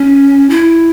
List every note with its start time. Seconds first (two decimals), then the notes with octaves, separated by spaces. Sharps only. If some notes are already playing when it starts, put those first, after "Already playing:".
Already playing: C#4
0.50 E4